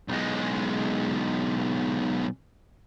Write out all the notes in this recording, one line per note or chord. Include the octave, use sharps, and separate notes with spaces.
B1 G#3